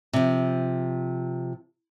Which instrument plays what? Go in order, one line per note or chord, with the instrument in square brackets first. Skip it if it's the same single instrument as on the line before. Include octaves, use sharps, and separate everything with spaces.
[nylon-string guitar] C3 F3